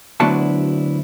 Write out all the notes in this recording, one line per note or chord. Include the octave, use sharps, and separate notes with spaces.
D2 F#3 B3 D4 E4 A5